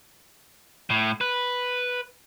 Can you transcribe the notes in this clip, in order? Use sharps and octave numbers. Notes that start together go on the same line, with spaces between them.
A2
B4